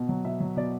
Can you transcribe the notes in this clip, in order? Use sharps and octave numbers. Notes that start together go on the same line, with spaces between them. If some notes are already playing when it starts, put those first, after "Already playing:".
Already playing: B2
F#3
B2 E5
F#3
B2 D5